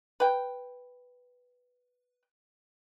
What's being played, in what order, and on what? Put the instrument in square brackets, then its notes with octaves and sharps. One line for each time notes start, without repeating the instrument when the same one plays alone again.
[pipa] B4 G5